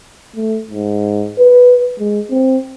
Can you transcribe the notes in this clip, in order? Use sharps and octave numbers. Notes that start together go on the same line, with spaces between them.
A3
G#2
B4
G#3
C4